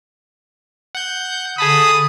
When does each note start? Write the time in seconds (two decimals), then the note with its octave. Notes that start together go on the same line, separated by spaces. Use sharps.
0.95 F#5 G6
1.58 D3 G#4 A5 B5 D#6